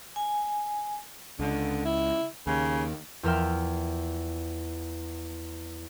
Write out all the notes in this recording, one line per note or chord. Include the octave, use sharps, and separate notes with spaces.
G#5
C#2 D3
E4
D#2 C#3
E2 F3 A#4 E5 G5 F6